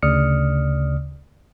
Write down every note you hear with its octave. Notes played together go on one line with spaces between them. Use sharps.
D2 C#3 D5 D#6 F6 C#7